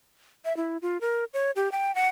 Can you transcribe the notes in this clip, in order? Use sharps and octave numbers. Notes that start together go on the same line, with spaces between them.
E5
E4
F4
A#4
C#5
G4
G5
F#5